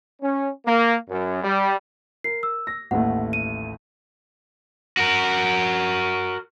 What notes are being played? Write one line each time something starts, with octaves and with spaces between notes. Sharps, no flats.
C#4
A#3
F#2
G3
A#4 C7
E6
A#6
A1 D#2 A3 F#5
D#7
F#4 A#4